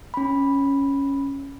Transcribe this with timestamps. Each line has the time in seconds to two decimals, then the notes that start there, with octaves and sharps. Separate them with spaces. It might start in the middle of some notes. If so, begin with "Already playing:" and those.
0.14 C#4 B5